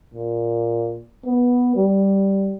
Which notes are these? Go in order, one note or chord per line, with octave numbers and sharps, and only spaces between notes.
A#2
B3
G3